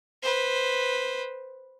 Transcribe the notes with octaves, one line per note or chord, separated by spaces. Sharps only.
B4 C5